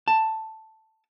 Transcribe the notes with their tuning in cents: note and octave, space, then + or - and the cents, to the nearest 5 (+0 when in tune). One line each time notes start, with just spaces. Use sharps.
A5 +5